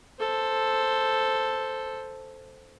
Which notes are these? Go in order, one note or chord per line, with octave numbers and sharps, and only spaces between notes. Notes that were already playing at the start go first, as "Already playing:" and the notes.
A4 C5